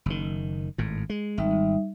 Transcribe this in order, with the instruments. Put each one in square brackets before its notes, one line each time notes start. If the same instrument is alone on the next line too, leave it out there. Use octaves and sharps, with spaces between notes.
[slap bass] F#1 D#3
G#1 A2
G#3
[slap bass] G#1 [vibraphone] G3 D#4 E5